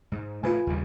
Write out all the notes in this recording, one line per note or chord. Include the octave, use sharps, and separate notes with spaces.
G#2
A2 F3 F4 B4 G#5
D#2 C#3 G3